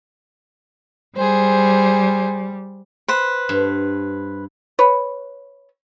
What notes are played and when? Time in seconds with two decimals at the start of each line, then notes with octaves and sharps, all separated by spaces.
1.17 G3 G#4 C5
3.08 B4 C5
3.49 G2
4.79 B4 C#5